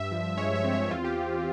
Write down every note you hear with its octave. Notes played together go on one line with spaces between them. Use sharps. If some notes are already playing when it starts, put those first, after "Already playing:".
Already playing: G2 E5
F3
G#3 C#5
E5
C4
C#5
E2 F4
G4